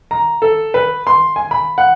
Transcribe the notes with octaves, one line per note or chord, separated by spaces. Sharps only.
A#5
A4
B4
C6
G#5
B5
F#5